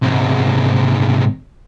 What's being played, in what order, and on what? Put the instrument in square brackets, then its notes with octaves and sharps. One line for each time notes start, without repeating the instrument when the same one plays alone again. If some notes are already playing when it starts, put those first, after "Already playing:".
[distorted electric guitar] C2 G#2